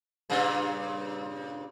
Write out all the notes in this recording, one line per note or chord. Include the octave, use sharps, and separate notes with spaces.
G2 A#2 C#3